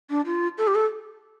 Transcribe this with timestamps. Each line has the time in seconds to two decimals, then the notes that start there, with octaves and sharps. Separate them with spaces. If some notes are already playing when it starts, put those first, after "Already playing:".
0.10 D4
0.26 F4
0.58 A4
0.67 G4
0.75 A4